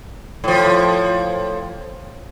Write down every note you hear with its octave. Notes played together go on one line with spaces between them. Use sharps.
A2 F3